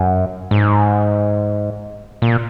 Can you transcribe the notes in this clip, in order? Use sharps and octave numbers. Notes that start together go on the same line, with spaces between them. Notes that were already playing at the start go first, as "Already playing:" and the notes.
Already playing: F#2
G#2
A#2